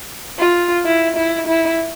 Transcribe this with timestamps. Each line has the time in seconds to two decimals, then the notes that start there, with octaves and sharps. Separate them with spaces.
0.39 F4
0.85 E4
1.17 E4
1.48 E4